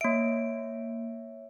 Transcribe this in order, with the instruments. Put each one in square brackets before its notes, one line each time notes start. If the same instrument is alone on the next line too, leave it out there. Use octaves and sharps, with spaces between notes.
[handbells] A#3 D7 [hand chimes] C#5 E5